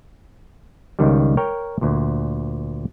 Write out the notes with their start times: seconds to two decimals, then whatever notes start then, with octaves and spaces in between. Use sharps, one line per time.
0.99 C#2 D#3 G3
1.37 A#4 C#5 G5
1.81 D2 A#2